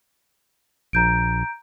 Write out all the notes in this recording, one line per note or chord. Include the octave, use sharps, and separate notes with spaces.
A#1 A#5 G6 D7